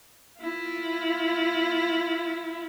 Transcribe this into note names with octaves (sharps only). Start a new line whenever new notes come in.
E4 F4